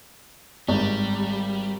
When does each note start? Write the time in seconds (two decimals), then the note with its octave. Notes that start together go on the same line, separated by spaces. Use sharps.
0.68 G#1 G3